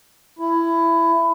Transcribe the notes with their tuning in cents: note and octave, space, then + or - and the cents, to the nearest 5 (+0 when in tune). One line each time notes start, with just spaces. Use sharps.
E4 +15